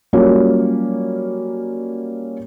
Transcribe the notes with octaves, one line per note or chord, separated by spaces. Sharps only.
F#3 G3 A#3 C#4 F4